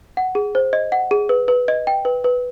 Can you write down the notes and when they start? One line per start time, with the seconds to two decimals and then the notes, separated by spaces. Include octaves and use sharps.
0.17 F#5
0.35 G#4
0.55 C5
0.73 D#5
0.92 F#5
1.11 G#4
1.29 B4
1.48 B4
1.68 D#5
1.87 G5
2.05 B4
2.24 B4